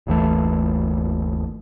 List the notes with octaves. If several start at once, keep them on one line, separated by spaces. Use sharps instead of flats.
G1 D#2 E3 A3